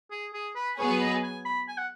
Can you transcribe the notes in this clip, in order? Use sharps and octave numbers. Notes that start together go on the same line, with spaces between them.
G#4
G#4
B4
F#3 B3 G#4 B4 C#5
D#5
G#5
B5
G#5
F#5